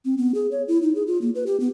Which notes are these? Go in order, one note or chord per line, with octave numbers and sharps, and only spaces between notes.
C4
B3
G#4
C#5
E4
D#4
G#4
F4
A#3
B4
G4
B3